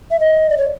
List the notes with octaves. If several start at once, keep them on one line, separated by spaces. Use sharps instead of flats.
E5
D#5
D5
C#5